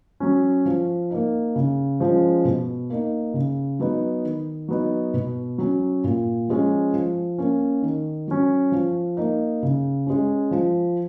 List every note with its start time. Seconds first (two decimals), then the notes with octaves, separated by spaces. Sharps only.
0.20 F#3 C#4
0.66 F3
1.11 A#3 D#4
1.56 C#3
2.00 F3 G#3 C#4
2.45 B2
2.90 A#3 D#4
3.34 C#3
3.79 F#3 B3 D#4
4.24 D#3
4.68 F#3 B3 D#4
5.14 B2
5.58 F#3 C#4
6.04 A#2
6.49 F3 G#3 C#4
6.93 F3
7.38 A#3 C#4
7.82 D#3
8.28 F#3 C#4
8.72 F3
9.17 A#3 D#4
9.63 C#3
10.07 G#3 C#4
10.51 F3